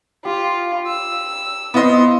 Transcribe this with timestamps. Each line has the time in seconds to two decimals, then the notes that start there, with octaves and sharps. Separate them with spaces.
0.25 F4 G4
0.89 E6
1.74 B3 E4 F4 C5 D#5